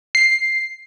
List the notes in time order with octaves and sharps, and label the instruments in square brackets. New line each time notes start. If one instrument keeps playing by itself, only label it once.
[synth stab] C7